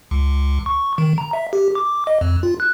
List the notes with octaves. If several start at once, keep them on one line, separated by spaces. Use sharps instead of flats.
C#2
C#6
D#3
A#5
E5
G4
D6
D#5
F2
F4
F#6